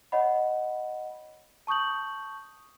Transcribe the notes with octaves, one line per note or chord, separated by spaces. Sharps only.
C#5 D#5 F#5 B5
A5 C#6 D#6 G6 F#7